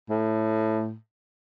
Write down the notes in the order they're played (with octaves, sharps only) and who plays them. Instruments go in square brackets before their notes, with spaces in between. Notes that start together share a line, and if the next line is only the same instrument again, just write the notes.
[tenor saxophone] A2